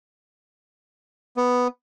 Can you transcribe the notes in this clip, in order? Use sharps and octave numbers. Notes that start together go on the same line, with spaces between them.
B3